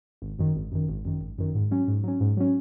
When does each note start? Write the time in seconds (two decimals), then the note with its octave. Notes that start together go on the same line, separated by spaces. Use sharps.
0.22 G#1
0.39 F#2 D#3
0.55 G#1
0.72 F#2 D#3
0.89 G#1
1.05 F#2 D#3
1.21 G#1
1.38 F#2 D#3
1.55 G#2
1.71 F#3 C#4
1.88 G#2
2.04 F#3 C#4
2.20 G#2
2.37 F#3 C#4